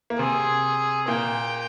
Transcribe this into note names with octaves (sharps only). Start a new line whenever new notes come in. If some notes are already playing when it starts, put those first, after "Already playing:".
A#3
C3 C4 G#4
A#2 A#3 G5